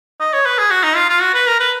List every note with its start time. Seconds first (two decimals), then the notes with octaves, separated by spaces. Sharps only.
0.20 D#5
0.33 C#5
0.46 B4
0.58 G#4
0.71 F#4
0.83 D#4
0.96 F4
1.09 F4
1.21 F#4
1.34 B4
1.47 A#4
1.60 B4